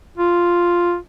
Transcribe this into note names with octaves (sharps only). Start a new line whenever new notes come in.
F4